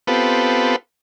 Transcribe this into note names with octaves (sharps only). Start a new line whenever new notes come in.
B3 C4 F4 G4 A4 B4